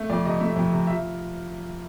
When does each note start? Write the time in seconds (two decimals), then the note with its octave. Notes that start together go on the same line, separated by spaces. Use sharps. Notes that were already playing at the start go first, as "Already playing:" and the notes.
Already playing: A3
0.10 F2 D5
0.25 C3 D#5
0.41 A3 E5
0.56 F2
0.72 C3
0.87 F4 E5